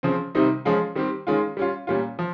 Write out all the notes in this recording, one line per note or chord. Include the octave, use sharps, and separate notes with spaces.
C#3 F3 C4
C3 D#3 G3 C4 D#4
F3 G#3 C#4 F4
D#3 G3 C4 G4
D#3 G#3 C#4 F4
G3 C#4 F4
A#2 G3 C#4 F4
F3